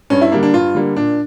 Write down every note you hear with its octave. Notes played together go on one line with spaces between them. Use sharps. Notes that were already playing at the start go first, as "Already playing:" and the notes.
G2 C#4
E4
D3 G3 A#3 D4
D4
G2 F4
D3 G3 A#3
A#2 D4